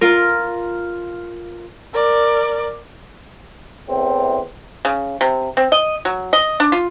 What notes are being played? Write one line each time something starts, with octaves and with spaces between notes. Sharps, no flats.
F4 A#4
A#4 D5
E2 A2 C4
C#3
C3
C4
D#5
F#3
D#5
D4
F4